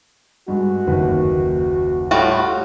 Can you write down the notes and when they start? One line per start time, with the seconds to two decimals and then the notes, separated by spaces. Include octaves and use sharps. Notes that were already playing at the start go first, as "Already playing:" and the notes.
0.48 G2 G#3 F#4
0.87 F#1 D#2 B4
2.11 A2 G3 F4 F#4